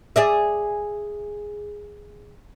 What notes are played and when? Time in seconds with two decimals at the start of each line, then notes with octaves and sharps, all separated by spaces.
0.16 G#4 D5 E5